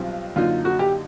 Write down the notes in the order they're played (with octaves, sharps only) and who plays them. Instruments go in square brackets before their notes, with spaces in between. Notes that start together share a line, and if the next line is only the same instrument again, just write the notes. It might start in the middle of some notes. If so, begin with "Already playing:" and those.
Already playing: [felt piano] B1 B2 G3 C4 F4
[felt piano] F#2 D3 F#3 A#3 D#4 [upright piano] F4
[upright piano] F#4
G4